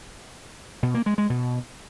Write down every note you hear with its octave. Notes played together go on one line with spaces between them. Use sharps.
B2
A#3
G#3
G#3
B2